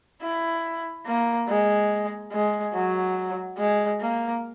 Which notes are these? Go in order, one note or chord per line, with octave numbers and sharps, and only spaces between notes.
E4
A#3
G#3
G#3
F#3
G#3
A#3